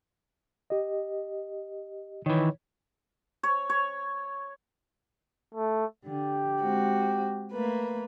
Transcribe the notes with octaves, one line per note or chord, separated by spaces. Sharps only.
G4 D#5
D#3 E3 C#5
C#5
C#5
A3
D3 G4
G#3 C4 F#4
A3 A#3 B4